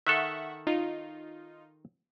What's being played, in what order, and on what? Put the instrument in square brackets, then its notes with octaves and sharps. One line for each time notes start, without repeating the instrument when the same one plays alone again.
[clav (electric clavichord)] D#3 A4 [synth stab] E5 F#5 C#6
[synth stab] D#4 F4